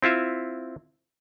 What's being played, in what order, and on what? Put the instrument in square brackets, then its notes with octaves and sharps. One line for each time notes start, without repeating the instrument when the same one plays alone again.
[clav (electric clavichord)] C4 E4 F4 E5